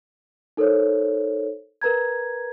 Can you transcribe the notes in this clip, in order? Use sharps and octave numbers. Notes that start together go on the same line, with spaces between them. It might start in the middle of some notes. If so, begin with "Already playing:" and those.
D#4 A4 A#4 C5 C#5
A#4 B4 A#5 G#6